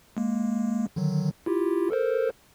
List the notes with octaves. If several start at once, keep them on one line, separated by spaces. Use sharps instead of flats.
G#3 A#3
D3 D#3 F#3
E4 F4 G4
A4 A#4 C5